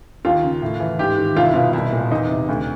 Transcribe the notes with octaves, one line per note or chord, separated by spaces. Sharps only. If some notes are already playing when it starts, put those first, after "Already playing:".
D#2 F4
C#3
A2
E3
G#2 G4
D#3
C2 F4
E4
B2 F4
C2 E4
A#2
E2 D#4
C3
D2